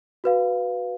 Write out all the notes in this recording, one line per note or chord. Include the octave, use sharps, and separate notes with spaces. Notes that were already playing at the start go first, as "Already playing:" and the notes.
F#4 B4 F5